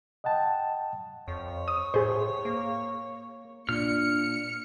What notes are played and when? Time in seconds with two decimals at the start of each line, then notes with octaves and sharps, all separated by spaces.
0.24 D#5 F#5 G5 A5
1.28 F2 C#5
1.68 D#6
1.94 A2 G#4 C5
2.45 A#3
3.69 A#2 D4 F6 C#7